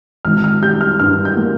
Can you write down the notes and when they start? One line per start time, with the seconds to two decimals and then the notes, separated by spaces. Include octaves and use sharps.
0.25 G#1 F6
0.44 F6
0.62 G3 G6
0.81 F6
0.99 G2 F6
1.25 G6
1.37 A#3